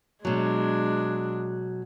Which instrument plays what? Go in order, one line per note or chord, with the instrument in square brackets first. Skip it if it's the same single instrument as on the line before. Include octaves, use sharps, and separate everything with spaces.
[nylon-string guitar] B2 F#3 [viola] G#3 D4